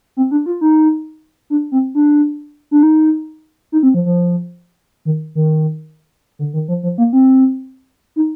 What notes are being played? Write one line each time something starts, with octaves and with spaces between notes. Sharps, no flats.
C4
D4
F4
D#4
D4
C4
D4
D4
D#4
D#4
C4
F3
F3
D#3
D#3
D3
D#3
F3
F3
A#3
C4
D#4